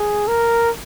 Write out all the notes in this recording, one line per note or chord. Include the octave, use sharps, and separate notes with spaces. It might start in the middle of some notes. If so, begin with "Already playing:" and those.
Already playing: G#4
A#4